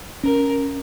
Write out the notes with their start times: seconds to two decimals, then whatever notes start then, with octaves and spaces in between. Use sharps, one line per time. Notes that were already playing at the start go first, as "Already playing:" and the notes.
0.23 C#4 A#4